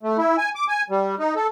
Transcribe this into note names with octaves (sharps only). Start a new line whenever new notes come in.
A3
E4
G#5
D6
G#5
G3
D#4
A4